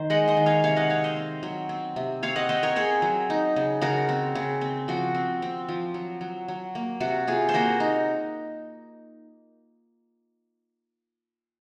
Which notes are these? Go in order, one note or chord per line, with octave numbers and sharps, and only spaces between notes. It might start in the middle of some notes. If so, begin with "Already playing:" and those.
Already playing: D#3 C5
G#3 D#5 F#5
C5 D#5
D#3
C#5 F5
C3 C#5 F5
D#5 F#5
C4 C#5 F5
C5 D#5
C4
F#3
C4
C3
C4 C#5 F5
D#5 F#5
C4 C5 D#5
A#4 C#5
C4 G#4 C5
F#3
D#4
C#3
C#3 F#4 A#4
C4
C#3
C4
F3 F#4
C4
C4
F3
F#3
F#3
F#3
A#3
C3 F#4
C3 F4 G#4
C5
A#3 F#4 A#4
D#4